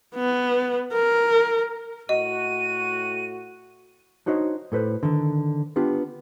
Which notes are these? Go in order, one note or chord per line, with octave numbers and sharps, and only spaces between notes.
B3
A#4
A2 F#4 D#5 D#7
D4 D#4 F#4 C5 C#5 D#5
A2 A4 B4 C5
D3 D#3
B3 D4 F4 G4